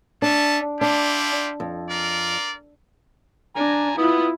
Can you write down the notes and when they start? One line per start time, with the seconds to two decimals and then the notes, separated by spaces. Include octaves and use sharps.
0.22 C#4 D4 E5 A5
0.81 D4 E4 F4 G4
1.60 F2
1.90 F4 A#4 D5
3.56 D4 G#5 A#5
3.98 B3 E4 F4 D#6